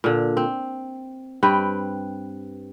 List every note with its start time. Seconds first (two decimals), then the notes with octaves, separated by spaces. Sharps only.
0.04 A#2 D3
0.37 C4
1.43 G2 C4 B4 G5